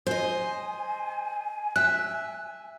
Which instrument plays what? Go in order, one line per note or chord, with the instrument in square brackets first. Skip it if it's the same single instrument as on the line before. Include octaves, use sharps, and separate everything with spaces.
[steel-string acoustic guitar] C5 D#5 [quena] G#5
[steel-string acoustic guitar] E5 [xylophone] F#6